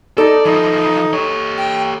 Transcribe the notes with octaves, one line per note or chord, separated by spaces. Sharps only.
D#4 A4 D5
E3 F3 D#4
G4 C#5
G5